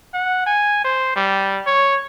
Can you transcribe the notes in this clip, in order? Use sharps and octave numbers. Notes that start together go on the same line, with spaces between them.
F#5
G#5
C5
G3
C#5